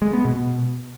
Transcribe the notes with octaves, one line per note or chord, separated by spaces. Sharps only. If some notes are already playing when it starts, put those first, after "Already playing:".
G#3
B3
B2